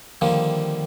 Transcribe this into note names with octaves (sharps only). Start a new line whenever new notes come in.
D3 D#3 F3 G3 A#3